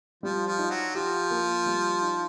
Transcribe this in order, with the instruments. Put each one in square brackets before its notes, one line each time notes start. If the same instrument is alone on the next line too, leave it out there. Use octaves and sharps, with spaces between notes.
[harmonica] F3 [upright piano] G3
[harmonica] F3
[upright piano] D#4
[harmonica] F#3
[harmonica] F3 [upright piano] G4
[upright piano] A#3
G3
D#4